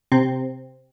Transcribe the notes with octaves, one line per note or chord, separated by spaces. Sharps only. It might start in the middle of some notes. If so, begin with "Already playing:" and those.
C3 C4